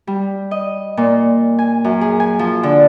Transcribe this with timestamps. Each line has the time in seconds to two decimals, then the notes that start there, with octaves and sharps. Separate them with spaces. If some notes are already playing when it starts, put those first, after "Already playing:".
0.07 G3
0.51 D#5
0.97 A#2
1.59 G#5
1.84 F#2
2.01 G#4
2.20 G#5
2.39 F3
2.63 D3